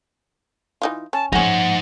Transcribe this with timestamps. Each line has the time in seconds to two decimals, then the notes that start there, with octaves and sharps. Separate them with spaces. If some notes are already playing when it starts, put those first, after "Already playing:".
0.82 E3 D#4 F4
1.13 C#4 A5
1.33 F3 G#3 A#3 C#4 D#4 C5 F#5